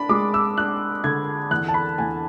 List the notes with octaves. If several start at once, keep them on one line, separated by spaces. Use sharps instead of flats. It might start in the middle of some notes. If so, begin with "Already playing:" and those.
Already playing: D4 B5
G#3 D6
E6
D4 F#6
D3 G#6
E2 F#6
A5
B5
E2 G#5